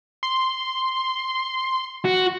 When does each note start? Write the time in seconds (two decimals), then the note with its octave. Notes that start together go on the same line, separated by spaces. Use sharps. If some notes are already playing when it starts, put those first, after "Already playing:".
0.23 C6
2.05 F#4